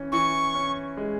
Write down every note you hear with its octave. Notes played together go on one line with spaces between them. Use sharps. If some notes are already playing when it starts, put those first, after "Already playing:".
Already playing: E3 C#4
E3 C#6
C#4
G#3